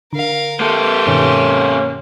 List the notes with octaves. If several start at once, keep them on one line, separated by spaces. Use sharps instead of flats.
D3 A#4 F5
A#3 G4 A4 C6
G2 B2 D#3 C#4